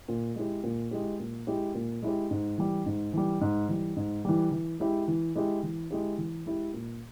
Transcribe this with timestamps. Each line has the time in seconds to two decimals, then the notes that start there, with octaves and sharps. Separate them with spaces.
0.08 A#2
0.36 G#3 E4 G4
0.64 A#2
0.91 G#3 E4 G4
1.19 A#2
1.47 G#3 E4 G4
1.75 A#2
2.02 G#3 E4 G4
2.31 G#2
2.58 E3 G3
2.86 G#2
3.13 E3 G3
3.41 G#2
3.69 E3 G3
3.96 G#2
4.25 E3 G3
4.52 E3
4.80 G#3 E4 G4
5.08 E3
5.35 G#3 E4 G4
5.63 E3
5.91 G#3 E4 G4
6.18 E3
6.46 G#3 E4 G4
6.74 A#2